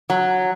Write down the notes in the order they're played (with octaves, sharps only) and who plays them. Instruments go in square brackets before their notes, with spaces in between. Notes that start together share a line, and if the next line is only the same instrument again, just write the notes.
[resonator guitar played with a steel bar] F#3